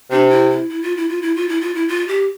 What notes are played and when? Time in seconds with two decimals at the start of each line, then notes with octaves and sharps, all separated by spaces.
0.11 C3 D4
0.30 E4
0.50 E4
0.70 E4
0.83 F4
0.97 E4
1.09 F4
1.22 E4
1.36 F4
1.49 E4
1.61 F4
1.75 E4
1.88 F4
2.08 G4